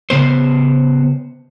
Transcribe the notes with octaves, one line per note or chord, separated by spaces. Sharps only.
C#3 B3 C5